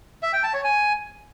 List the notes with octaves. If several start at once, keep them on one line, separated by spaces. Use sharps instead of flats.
E5
G5
A5
C#5
G#5